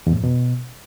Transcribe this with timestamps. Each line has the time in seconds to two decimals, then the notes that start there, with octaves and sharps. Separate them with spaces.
0.07 E2
0.12 A2
0.18 F2
0.24 B2